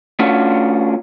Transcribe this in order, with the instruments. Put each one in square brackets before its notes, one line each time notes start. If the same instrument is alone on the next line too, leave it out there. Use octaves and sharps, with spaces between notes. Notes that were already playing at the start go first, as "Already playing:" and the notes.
[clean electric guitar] A3 C#4 D4 F4 F#4